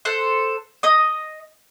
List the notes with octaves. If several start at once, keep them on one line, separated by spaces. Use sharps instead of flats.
A4 C5 F#6
D#5 D#6